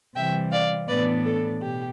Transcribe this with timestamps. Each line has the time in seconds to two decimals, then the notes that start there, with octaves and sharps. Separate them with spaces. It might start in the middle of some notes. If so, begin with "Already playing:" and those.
0.15 C3 E3 G3 E5 G5
0.51 D5 F5
0.88 A2 E3 B3 D4 B4 D5
1.24 A4
1.61 B2 G4